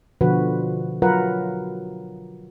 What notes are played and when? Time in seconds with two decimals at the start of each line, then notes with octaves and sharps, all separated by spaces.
0.21 B2 D3 F3 F#4 B4
1.02 F#3 F4 A#4 B4 F#5